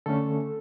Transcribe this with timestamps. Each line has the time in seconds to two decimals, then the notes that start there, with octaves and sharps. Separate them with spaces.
0.06 D3 A3 C#4 A4